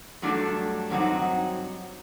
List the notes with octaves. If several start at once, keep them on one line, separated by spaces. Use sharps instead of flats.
G2 F#3 A3 D4 A4
G2 F#3 C4 D#4 F#4